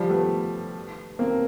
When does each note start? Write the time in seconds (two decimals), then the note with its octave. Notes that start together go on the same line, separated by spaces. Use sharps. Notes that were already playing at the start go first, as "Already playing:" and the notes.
Already playing: F3 G3
0.10 A3 B3
1.19 A#3 C4